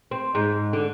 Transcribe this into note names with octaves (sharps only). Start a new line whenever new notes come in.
C4
G#2
D3